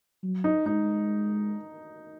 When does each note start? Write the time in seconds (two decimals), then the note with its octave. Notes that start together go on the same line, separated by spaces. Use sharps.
0.23 F#3
0.44 D#4
0.66 G#3 D#4